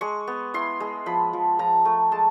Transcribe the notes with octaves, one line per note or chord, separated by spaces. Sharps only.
G#3 C#6
B3
E4 C6
G#3
F3 B5
F3
F3 A#5
A3
G#3 A5